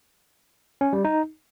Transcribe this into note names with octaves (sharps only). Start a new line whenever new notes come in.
C#4
G3
D#4